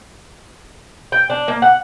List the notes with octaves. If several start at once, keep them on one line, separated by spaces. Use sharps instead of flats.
G5
D4
A#3
F#5